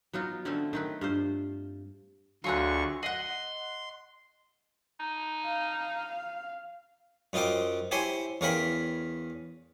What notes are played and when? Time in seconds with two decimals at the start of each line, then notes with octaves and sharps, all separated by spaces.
0.13 F#3 B3 D#4 F4
0.45 D3 A3 C4 C#4
0.73 D#3 C4 B4
1.01 G2 F4 C5
2.44 D2 F#3 F4 G#4 C#6 F#6
3.03 D#5 F#5 C6 F#7
5.00 D#4
5.46 F5
7.33 F#2 D#4 F4 C5 G5 D6
7.91 E4 G4 C5 C#5 G#5 C6
8.41 E2 C#4 A#4 F5 G5 B5